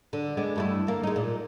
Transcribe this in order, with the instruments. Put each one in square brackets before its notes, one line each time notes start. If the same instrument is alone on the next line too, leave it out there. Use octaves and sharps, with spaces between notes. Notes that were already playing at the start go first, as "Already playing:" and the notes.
[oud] D3
G#3 B3 D4
G2 A3 E4
D3 A#3
G#3 D#4
A#2